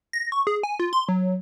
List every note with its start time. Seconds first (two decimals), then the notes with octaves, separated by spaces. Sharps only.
0.13 A#6
0.32 C#6
0.47 G#4
0.63 G#5
0.79 F4
0.93 C6
1.09 F#3